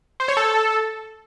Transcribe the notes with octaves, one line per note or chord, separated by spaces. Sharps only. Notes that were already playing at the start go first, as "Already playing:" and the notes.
C5
C#5
A4